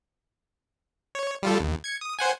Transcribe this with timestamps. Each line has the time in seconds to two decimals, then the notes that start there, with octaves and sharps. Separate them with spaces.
1.15 C#5
1.43 G3 F4 A4
1.59 D#2
1.84 G#6 C#7
2.01 D#6
2.19 C5 F#5 G#5